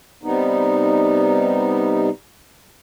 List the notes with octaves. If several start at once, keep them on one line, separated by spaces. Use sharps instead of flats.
C3 G3 B3 D#4